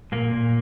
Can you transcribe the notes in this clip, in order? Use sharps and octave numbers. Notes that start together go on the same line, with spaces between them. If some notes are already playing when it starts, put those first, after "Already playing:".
A#2 A#3
A#2